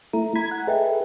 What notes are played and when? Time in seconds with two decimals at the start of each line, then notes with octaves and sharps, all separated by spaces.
0.13 A3 E4 A#5
0.36 A#5 B5 G#6
0.51 F#5
0.67 G#4 A4 B4 D#5 E5 G5